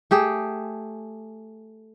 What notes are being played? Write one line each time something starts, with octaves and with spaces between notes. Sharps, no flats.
A3 G4 G#4